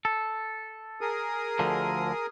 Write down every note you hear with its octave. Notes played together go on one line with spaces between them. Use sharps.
A4
G#4 A#4 D#6
D2 D3 F3